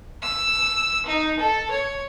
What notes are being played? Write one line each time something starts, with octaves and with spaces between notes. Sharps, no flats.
E6
D#4
A4
C#5